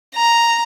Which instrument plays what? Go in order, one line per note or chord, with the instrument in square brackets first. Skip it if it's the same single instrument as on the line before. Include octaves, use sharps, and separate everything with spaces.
[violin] A#5